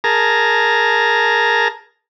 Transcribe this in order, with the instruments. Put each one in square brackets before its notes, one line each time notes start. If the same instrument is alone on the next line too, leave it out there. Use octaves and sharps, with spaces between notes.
[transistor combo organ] G#4 A#4 A5 A#5